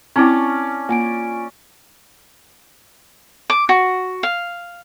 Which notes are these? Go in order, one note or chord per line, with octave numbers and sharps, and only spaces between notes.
C4 C#4 E4 D5 G5 A5 C#6 F6
A#3 F4 G#5 D7
D6
F#4
F5